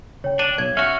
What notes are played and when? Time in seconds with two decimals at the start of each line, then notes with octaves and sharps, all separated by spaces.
0.24 C#3 C#5 G5
0.39 D4 D#7
0.58 B1 C#5 G#6
0.77 C#4 F#4 E5 F6